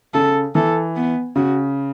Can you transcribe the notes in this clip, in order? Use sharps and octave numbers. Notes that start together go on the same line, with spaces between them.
C#3 A4
E3 A4
B3
C#3 F#4